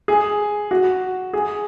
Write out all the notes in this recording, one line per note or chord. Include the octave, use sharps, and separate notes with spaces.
G#4
F#4
G#4